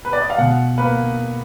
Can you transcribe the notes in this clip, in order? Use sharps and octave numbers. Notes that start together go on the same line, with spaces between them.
B4
D5
D#5
F5
B2 F#5
A#3 B4